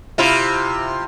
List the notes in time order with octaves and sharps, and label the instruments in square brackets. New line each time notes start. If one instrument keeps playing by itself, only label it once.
[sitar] C3 E4 F4